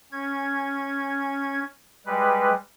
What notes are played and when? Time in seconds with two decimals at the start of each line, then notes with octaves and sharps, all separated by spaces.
0.12 C#4 G#6
2.06 G3 G#3 B4